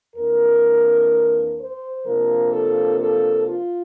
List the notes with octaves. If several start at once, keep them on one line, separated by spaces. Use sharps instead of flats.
F2 E3 A#3 D4 A#4
C5
C3 F3 A#3 D4 A#4
A4
A4
F4